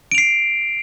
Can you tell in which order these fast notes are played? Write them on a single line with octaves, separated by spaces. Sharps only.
D7 F7 C7